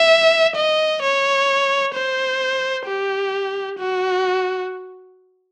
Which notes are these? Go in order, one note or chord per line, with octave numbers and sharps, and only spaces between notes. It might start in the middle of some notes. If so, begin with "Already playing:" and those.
Already playing: E5
D#5
C#5
C5
G4
F#4